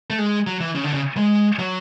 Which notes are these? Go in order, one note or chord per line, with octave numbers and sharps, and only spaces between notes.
A3
G#3
F#3
E3
C#3
D3
C#3
G#3
F#3